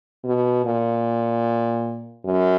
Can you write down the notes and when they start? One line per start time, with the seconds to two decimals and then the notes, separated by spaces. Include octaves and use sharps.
0.24 B2
0.65 A#2
2.25 F#2